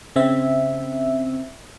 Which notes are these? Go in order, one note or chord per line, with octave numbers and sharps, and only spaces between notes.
C#3 C4 E5